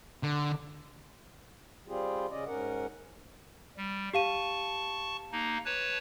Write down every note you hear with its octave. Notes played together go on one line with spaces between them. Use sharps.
D3
G3 C4 F4 G4 G#4
C#3 C#4 D5 D#5
G#2 C#4 A#4 F#5
G3
G4 F5 A5 C#6 D#7
A#3 D#4
B4 C#5 A5